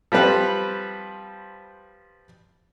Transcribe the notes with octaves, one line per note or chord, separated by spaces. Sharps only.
F3 G3 C4 B4